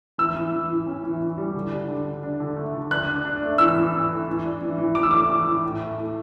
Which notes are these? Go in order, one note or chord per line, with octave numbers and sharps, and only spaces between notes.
E3 E6
E3
E3
E3
C#4
E3
E3
G3
D3
D4
D3
D4
D4
D3
A3
D3
D4 F#6
D4
D4
A3
E3 E6
E3
E3
A3
E3
D4
E3
E3
E3 D6
E6
A3 D6
E3
E3
A2
A3
A3